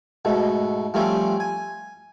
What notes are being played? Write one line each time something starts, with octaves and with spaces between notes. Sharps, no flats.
G#2 B2 A3
F3 G3 A3 C4 C#4
G#5